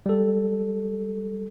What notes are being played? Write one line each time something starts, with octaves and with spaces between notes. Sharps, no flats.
G3 A4